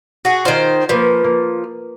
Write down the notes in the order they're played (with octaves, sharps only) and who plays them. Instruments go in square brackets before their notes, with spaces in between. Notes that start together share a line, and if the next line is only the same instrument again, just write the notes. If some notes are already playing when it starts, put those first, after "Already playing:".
[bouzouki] F#4 G#4
[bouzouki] D#3 C5 [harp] F4 G#4
[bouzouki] F3 [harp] A#3 B4
[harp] A#3